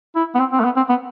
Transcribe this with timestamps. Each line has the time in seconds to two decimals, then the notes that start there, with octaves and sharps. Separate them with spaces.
0.16 E4
0.35 B3
0.39 C4
0.52 C4
0.60 A3
0.64 B3
0.76 C4
0.89 B3